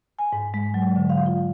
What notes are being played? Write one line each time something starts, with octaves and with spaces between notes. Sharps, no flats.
G#5
G#2
G#3
F#3
D3
F5
F4